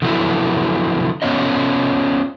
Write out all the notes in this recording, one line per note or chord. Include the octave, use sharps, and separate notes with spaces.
D3 F3 F#3 B3 E4
B3 C#4 F4 D#5